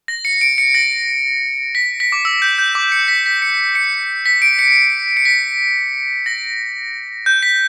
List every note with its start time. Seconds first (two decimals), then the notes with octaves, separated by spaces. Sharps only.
0.08 A#6
0.25 C#7
0.41 D7
0.58 C#7
0.74 A#6
1.75 B6
2.00 B6
2.12 D6
2.25 E6
2.42 G6
2.58 G6
2.75 D6
2.92 C#7
3.08 B6
3.26 B6
3.42 C#7
3.75 C#7
4.26 B6
4.42 D7
4.59 C#7
5.17 C#7
5.25 B6
6.26 A#6
7.26 G6
7.43 B6